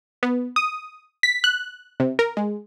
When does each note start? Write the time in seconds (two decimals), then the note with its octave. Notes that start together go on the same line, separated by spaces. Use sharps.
0.23 B3
0.56 D#6
1.23 B6
1.44 F#6
2.00 C3
2.19 A#4
2.37 G#3